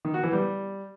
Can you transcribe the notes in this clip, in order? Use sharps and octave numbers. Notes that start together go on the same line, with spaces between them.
D#3
F#4
E3
G3